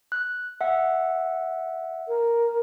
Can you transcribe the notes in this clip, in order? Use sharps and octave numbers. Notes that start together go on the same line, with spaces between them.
F#6
E5 F#5
A#4